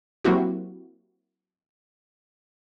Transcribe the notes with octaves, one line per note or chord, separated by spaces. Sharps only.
F#3 A#3 C4 E4 F#4 G4